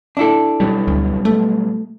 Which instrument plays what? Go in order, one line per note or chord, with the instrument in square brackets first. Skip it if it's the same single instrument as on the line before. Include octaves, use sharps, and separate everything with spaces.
[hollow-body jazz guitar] D4 E4 A4
[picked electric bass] B2 F#3 G3
[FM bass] D2
A3